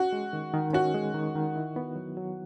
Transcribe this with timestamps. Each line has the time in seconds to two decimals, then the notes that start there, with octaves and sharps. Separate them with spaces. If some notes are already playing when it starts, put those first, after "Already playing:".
Already playing: C#4 F#4
0.13 G#3
0.33 D#3
0.54 D#3
0.73 C#4 F#4
0.94 G#3
1.14 D#3
1.36 D#3
1.56 E4
1.76 B3
1.96 F#3
2.17 F#3